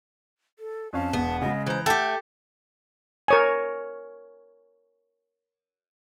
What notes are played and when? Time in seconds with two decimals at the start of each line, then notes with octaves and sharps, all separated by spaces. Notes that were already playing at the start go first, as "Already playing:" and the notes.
0.59 A4
0.93 F2 C#4 F5 A5
1.13 E1 B3
1.42 C#3 G#3 D#5
1.67 E3 C5 A#5
1.86 A3 G4 A4 F#5 G5
3.28 A#4 C#5 G#5